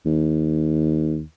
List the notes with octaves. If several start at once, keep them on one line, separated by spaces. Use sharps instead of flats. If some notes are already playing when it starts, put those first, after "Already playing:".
D#2